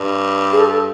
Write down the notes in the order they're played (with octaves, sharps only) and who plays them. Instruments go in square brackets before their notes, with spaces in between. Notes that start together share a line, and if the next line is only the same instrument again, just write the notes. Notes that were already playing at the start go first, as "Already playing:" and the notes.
Already playing: [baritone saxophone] G2
[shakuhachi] G#4
A4